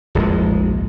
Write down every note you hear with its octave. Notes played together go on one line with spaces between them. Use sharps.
D1 A#1 F2 G#3